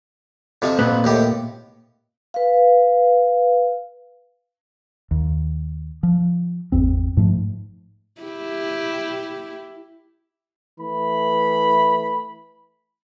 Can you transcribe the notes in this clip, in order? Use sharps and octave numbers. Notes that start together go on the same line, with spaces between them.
F2 C3 F3
A#2 B3
D#2 A2 G4
B4 F5
D#2
F3
G#1 E2 C4
G#2 F3 A3
E4 G4
E3 A3 B5